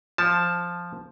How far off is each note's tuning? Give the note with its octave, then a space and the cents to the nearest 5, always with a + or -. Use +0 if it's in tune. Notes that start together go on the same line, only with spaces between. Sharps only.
F3 +0 A5 +0